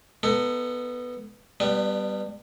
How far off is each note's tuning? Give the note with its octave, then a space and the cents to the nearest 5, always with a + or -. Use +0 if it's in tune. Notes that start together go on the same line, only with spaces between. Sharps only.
B3 +0 D#4 +0 A4 +20
G3 +0 B3 +0 D4 +35